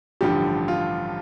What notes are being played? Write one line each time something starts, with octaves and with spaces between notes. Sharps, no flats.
A1 G2 D3 F3 G4
F4